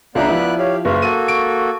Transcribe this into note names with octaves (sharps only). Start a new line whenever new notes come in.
C#2 B3 D4 D5 E5 A#5 F#6
F3 E4
G4 C#5 F5
F#1 B4 F5 C#6
A#3 F#4 A4 D#7
D7